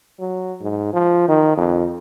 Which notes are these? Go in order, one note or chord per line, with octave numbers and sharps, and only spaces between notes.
F#3
G#2
F3
D#3
F2